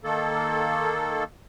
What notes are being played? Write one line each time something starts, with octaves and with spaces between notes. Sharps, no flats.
D#3 A#3 A4